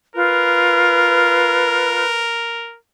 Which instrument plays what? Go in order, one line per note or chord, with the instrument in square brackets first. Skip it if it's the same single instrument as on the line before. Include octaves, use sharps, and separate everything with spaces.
[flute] F4 [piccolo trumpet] A#4 [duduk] B4